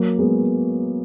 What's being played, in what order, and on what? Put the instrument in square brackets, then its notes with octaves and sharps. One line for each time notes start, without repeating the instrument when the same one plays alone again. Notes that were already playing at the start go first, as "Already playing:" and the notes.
Already playing: [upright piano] F#3 A#3
G#3 B3